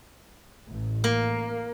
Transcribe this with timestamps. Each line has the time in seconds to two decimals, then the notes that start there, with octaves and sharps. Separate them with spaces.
0.67 A1
1.04 A#3